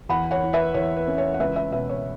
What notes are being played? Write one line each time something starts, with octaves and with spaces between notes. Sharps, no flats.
E2 F#5 B5
C#5 F#5
E3
B4 E5
E2 C#5
B4
C#4
C#5
F#5
C#2 B4 E5
B4 E5
B2 B4 E5
C#5